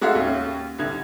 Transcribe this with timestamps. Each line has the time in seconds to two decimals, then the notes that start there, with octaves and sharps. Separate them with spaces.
0.01 G#3 F#4 A4 E5 F5
0.15 D#2 C#4
0.79 C2 D3 G#6